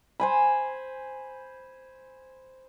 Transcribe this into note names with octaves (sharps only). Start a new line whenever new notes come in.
C5 G#5 B5